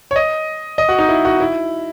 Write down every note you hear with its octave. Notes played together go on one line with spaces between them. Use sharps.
C#5
D#5
D#5
F#4
D#4
E4
F#4
E4